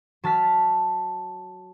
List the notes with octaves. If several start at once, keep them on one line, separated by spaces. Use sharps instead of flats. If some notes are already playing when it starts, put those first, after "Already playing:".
F#3 A5 F6 B6